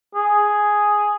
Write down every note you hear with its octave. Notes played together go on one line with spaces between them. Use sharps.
G#4